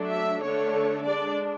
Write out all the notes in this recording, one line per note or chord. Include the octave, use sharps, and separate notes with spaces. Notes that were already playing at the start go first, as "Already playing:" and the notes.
Already playing: F#3 A3 D4
E5
D3 A3 D4 C#5
G#3 D4 D5